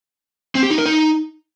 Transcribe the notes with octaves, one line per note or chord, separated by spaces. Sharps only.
C4
G4
D#4
A#4
D#4